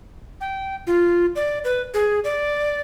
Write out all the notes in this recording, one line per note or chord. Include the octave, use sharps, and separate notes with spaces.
G5
F4
D5
B4
G#4
D5